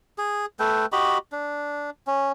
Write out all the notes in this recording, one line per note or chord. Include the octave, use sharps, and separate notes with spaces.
G#4
A3 A4 B4 G5
F#4 G4 D#5 B5
D4
C#4